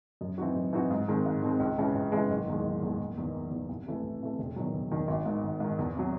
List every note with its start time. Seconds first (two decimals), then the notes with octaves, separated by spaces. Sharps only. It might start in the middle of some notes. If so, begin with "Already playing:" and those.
0.21 F#2
0.38 E3 C4 D#4 F#4
0.56 F#2
0.73 E3 C4 D#4 F#4
0.91 G#2
1.08 D#3 G#3 C4
1.26 G#2
1.42 D#3 G#3 C4
1.60 C#2
1.78 C#3 E3 G#3
1.95 C#2
2.12 C#3 E3 G#3
2.30 F#1
2.48 E2 D#3 G#3
2.64 F#1
2.83 E2 D#3 G#3
3.00 F#1
3.18 E2 D#3
3.35 F#1
3.51 E2 D#3
3.69 C2
3.86 C3 E3 A3
4.03 C2
4.22 C3 E3 A3
4.39 E1
4.56 E2 D#3 F#3
4.74 E1
4.91 E2 D#3 F#3
5.08 G#1
5.25 G#2 D#3
5.44 G#1
5.60 G#2 D#3
5.79 E2
5.96 C3 F#3